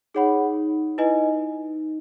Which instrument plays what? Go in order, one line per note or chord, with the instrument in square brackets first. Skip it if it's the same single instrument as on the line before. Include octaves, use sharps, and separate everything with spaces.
[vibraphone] D#4 [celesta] G#4 C#5 F#5 B5
[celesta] E4 B4 D#5 G#5